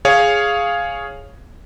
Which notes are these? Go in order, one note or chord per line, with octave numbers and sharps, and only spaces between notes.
G#4 C#5 F5